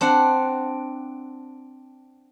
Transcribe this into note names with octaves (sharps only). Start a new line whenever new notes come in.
C4 D4 F#5